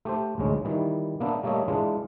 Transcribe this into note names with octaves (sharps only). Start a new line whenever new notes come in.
A3 G4 C5
A1 D2 G#3 C#4
D#3 E3 G3
A#3 B3 D4 E5
G3 A3 A#3 C#5 D#5 E5
E3 G#3 D4 F4